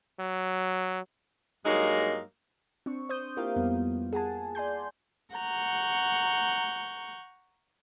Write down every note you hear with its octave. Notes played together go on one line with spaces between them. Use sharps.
F#3
G2 F#3 G#3 A#3 D#4
C4 D4 C#6
C5 D#6 G6
A#3 E4 F4 G4 A#4 F5
F2 G3 A#3 B3
G#4 F#5 G#5 A5
D5 G#5 C6 G6
F#5 A#5 C#6 G6